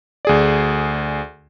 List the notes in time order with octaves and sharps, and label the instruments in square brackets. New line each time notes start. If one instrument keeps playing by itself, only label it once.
[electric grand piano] D2 G#4 D5